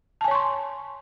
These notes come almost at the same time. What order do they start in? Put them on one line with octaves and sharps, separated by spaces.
A5 G#5 C#5 C#6 C6